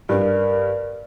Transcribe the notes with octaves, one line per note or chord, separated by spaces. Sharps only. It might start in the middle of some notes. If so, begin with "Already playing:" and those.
G2 A#4